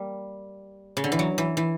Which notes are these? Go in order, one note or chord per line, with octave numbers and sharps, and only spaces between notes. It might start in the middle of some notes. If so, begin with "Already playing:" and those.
Already playing: G3 A#3
C#3
D3
E3
F#3
E3
E3